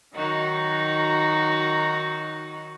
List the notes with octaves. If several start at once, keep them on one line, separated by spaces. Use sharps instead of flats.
D#3 F#3 D#4 F#4